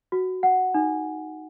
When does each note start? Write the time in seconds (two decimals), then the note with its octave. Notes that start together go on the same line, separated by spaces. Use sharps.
0.12 F#4
0.43 F#5
0.74 D#4